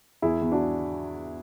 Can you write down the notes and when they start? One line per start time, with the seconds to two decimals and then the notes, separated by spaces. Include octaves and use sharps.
0.22 E2 E4 G#4
0.42 E2
0.52 D4 F#4